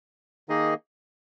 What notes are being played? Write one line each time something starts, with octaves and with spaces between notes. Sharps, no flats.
D#3 A#3 D#4 G#4 D#5